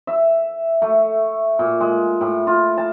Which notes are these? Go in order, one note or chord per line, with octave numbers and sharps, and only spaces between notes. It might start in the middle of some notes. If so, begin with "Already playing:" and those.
E5
A3
A#2
G#3
A2
F4
A5